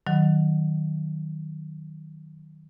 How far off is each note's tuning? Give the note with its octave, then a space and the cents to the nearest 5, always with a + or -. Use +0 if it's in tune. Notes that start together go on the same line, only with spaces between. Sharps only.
D#3 -5 F#3 +5